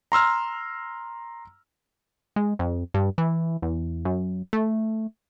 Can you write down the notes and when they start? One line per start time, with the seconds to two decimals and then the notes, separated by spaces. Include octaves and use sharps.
0.12 A#5 C6 E6 F6
2.36 G#3
2.59 F2
2.94 G2
3.18 E3
3.62 E2
4.05 F#2
4.53 A3